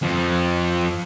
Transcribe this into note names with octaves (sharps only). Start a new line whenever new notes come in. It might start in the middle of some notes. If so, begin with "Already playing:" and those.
F2 F3